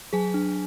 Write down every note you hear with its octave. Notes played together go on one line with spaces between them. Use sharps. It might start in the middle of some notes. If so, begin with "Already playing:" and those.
F#3 G#4 G#5
D4